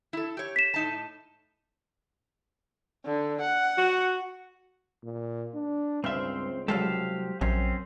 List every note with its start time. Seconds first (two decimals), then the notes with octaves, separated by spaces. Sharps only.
0.13 E4 A4
0.37 G4 C#5
0.56 B6 E7
0.74 A2 D#4 A5
3.05 D3
3.41 F#5
3.78 F#4
5.04 A#2
5.54 D4
6.04 C#2 G2 C4 C5 E5 F6
6.68 C2 F#3 G#3 G4 A4 C5 F5
7.41 A#1 F#2 C4 C#4 C5